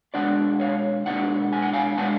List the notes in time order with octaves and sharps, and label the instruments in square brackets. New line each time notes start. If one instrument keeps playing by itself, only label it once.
[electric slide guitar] B2 G#3 D4 D5 F#5
C#5 F5
B2 G#3 D4 D5 F#5
G#5
F#5
F5 G#5
B2 G#3 D4 F#5 A5